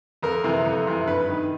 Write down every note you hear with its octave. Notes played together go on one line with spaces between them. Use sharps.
F2 A#4
C3 E3
F2
C3 E3
G2 B4
D#3